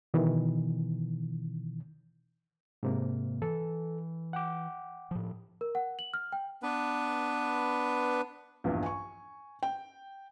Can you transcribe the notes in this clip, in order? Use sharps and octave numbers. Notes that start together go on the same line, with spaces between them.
B2 D#3 E3
G#2 C3 A#3
E3 A4
F#5 G5 D6
A2 F3
A#4
F#5
F#7
F6
G5
B3 D4 B4
A#1 E2 G2
G#5 C#6
G5